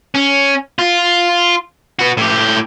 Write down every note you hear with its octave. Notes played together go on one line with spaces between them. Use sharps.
C#4
F4
B3 F#4
A2 G4